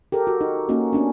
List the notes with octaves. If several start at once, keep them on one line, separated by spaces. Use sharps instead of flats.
G4 A4 A#4
F#4
D#4
A#3 C#4 D#4 F#4
B3 C#4 D4